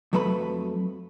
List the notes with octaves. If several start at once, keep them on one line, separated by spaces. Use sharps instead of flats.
F2 F#3 A3 B4 A#5 B5